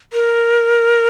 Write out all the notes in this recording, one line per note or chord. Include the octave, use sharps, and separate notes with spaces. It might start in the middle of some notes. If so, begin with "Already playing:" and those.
A#4